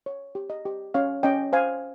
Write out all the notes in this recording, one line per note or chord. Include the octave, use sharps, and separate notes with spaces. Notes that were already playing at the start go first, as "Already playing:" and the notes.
C#5
G4
D#5
G4
C#4 C#5 F5
C#4 D#5 G5
C5 F5 G#5